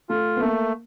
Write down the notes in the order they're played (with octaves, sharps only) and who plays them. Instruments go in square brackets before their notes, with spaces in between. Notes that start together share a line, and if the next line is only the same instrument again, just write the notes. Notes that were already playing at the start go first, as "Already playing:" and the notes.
[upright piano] A3 [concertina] F4
[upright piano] B3
[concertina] A3 [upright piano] A#3